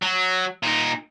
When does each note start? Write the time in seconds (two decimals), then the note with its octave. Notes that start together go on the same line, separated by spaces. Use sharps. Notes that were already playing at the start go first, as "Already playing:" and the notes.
0.02 F#3
0.63 A#2 D#4